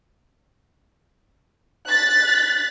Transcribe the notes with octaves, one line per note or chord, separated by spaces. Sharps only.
F#6 A6 B6